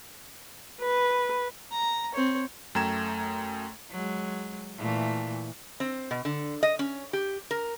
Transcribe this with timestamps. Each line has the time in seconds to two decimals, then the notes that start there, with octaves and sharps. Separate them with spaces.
0.81 B4
1.72 A#5
2.14 C4 C#5
2.75 F#2 A3 G5 A#5 G#6 E7
3.91 F#3 G#3
4.78 A#2 E3 A3
5.80 C4
6.11 B2
6.25 D3
6.63 D#5
6.79 C#4
7.13 G4
7.51 A#4